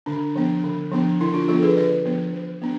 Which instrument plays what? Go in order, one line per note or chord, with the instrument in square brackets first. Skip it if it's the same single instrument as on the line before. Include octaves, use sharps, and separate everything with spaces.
[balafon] D3 D4
F3 B3 D4
D3
F3 B3 D4
D3 E4
D4 F4
F3 B3 D4 F4 A4
G#4 B4
D3 B4 D5
F3 B3 D4
E3
B3 D4